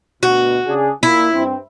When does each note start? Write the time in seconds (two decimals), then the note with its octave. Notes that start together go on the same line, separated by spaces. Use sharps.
0.23 D2 B2 F#4
0.66 C#3 D4 G#4
1.03 A#2 E4
1.32 G2 C4